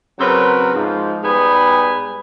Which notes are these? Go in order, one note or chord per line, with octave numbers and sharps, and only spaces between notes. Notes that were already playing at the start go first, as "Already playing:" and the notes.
C#3 F#3 C4 C#4 A#4 B4
G#2 F3
G#2 G3 B3 G#5 B5